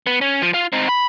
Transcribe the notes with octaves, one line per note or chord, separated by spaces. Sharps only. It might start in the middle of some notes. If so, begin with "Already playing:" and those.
B3
C#4
F3
F4
C4 D#4
B5